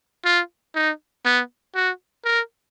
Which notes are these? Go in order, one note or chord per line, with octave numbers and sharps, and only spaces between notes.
F4
D#4
B3
F#4
A#4